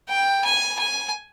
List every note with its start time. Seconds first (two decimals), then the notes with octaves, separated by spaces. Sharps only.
0.09 G5
0.44 G#5
0.79 G#5